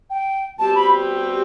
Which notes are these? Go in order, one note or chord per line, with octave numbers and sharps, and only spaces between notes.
G5
B2 G3 C4 G4 A5
B5